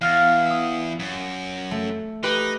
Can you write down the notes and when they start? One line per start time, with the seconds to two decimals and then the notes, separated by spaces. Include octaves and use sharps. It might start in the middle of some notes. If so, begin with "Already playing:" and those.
0.01 E2 F5 F6 A6
0.46 D#6 E6
0.99 F#2
1.71 A3
2.24 D#4 G4 B4